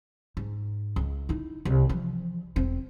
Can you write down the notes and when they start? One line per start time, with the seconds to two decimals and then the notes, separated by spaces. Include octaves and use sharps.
0.37 G#2
0.96 C#2
1.29 D#4 E4
1.65 C2 C3
1.89 E3 F3
2.56 E1 C4